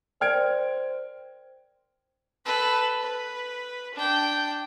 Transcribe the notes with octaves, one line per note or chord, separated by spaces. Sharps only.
A#4 C5 D5 G5 F6 G#6 D7
A4 B4
B4
D4 G5